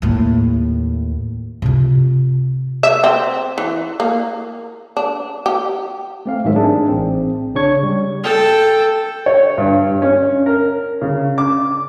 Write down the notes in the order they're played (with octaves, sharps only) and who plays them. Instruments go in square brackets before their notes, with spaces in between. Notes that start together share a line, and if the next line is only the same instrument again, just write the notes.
[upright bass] D#2 A2
C3 F4
[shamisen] E5
C4
E3
A#3
D4
G4
[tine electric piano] A3 C4 F5
G#2 D#3 F#3 G4 A#4 E5
D4 D#4 G#4
A1 C4
C#3 D4 C#5 C#6 G#6
G3
[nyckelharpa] A4 G5
[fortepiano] C#5
G2
C#4
A#4
C#3
D6